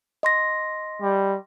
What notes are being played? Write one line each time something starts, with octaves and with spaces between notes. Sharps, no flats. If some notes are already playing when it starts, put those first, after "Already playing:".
D#5 C6 A#6
G3